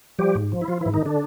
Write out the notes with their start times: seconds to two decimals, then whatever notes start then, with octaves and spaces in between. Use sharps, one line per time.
0.19 F3 G3 G4
0.35 G#2
0.52 F3
0.61 E4
0.68 F3 F4
0.81 E3 E4
0.86 G#2
0.94 D#3 D#4
1.06 D3 D4